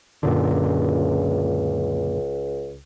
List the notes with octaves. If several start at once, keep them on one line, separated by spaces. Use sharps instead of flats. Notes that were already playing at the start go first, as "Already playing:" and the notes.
C#2 F#2 A#2 D3